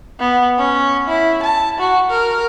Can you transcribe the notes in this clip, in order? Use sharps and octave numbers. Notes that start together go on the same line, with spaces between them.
B3
C#4
E4
A5
F#4
A#4